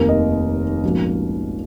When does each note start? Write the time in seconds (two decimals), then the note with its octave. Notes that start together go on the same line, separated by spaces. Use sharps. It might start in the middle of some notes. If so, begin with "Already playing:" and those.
Already playing: F1 D#2 D#3 A#3 A#4
0.09 D#5
0.83 A#1 G#2 F3 A#3 C#4 F#4